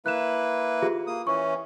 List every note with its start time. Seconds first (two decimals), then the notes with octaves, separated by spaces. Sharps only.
0.06 A#3 E4 B4 F#6 E7
0.82 F4 G4 G#4
1.07 A#3 D#6
1.27 E3 C#4 C#6